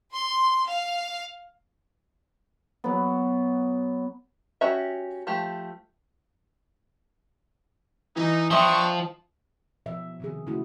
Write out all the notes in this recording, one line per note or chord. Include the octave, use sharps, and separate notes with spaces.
C6
F5
F#3 B3
C#4 F#4 G4 E5
F3 A3 G4
E3 D#4
F3 B3 D4 D#5 E5 G5 C#6 D#6
B2 F3 E5
C3 D#3 G#4
C#3 A3 E4 F#4